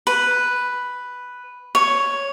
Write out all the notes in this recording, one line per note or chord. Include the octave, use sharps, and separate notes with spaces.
B4
C#5